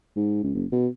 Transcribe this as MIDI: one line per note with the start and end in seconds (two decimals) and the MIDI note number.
0.16 0.39 44
0.43 0.52 37
0.55 0.66 30
0.72 0.88 47